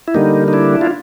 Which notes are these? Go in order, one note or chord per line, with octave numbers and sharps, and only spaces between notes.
E4
D3 G3 A#3 D#4
D#4
D4 E4
F4